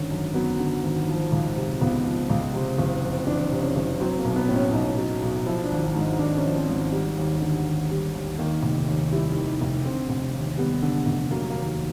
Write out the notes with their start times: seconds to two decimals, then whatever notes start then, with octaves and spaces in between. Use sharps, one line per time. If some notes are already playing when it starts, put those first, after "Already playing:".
Already playing: G#1 D3 C#4
0.11 F#2
0.34 F#3 B3
0.59 D3
0.83 G#1
1.08 F3
1.32 C#2
1.56 C3
1.81 C#2 B3
2.05 F3
2.30 C#2
2.53 C3 C4
2.78 F#1
3.03 F2
3.27 E3 D4
3.51 C3
3.63 C#4
3.76 F#1
4.00 F#3 C4
4.19 A#3
4.25 B1
4.36 B3
4.49 A2
4.56 C#4
4.73 B1 D#4
4.98 F#3
5.22 B1
5.46 F3 E4
5.64 D4
5.71 G#1
5.83 D4
5.95 G#2
6.01 D#4
6.19 G#1 D4
6.37 C#4
6.44 F3
6.56 C4
6.69 G#1
6.92 G3
7.17 D#2
7.42 D3
7.65 D#2
7.91 G3
8.15 D#2
8.39 D#3 A#3
8.62 F1
8.88 D#2
9.12 G3 E4
9.37 D#3
9.61 F1
9.85 D3 C4
10.09 F1
10.34 D#2
10.57 G3 B3
10.82 D3
11.06 F1
11.31 F#3 A#3
11.50 A#3
11.55 D#2